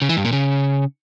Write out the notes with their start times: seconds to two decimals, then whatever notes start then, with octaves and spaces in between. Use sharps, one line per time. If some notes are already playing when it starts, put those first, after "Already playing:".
0.02 C#3
0.09 E3
0.17 G2
0.25 A#2
0.32 C#3